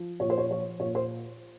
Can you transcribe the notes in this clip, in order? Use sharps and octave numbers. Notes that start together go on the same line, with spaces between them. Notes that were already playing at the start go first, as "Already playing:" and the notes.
Already playing: F3
A#2 C#5
C5
C#5
F3 C#5
A#2 C#5
C5